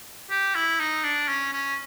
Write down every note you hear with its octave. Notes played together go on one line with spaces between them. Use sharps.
G4
E4
D#4
D4
C#4
C#4